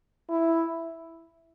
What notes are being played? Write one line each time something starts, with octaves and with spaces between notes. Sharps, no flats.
E4